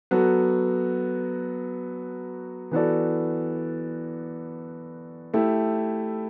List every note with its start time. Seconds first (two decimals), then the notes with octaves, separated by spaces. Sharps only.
0.11 F#3 B3 F#4 A4
2.71 E3 B3 F#4 A4 D5
5.34 A3 E4 G4